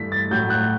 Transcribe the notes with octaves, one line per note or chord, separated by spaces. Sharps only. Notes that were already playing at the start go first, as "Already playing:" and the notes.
Already playing: G2 E3 A3 B6
A6
A2 F#3 A3 G6
F#6